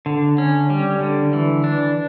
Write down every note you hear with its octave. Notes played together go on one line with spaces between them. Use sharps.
D3
C#4
G3
D3
E3
D4